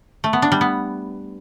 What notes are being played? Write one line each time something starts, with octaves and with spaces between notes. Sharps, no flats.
A3
B3
D4
G3
B3